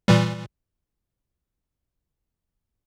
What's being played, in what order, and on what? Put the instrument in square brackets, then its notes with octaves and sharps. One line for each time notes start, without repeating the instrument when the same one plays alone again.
[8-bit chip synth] A#2 E3 G3